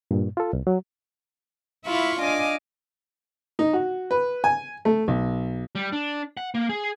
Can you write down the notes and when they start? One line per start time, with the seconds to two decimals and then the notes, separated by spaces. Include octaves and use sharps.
0.11 G2 A#2
0.37 F4 A4
0.53 C2
0.67 F#3
1.85 E4 F4 E5 F5 B5 C#6
2.21 D4 D#5 F5 G#5 D6
3.59 D#4
3.73 F#4
4.11 B4
4.44 G#5
4.85 A3
5.08 B1
5.75 G3
5.92 D4
6.37 F#5
6.55 A#3
6.69 G#4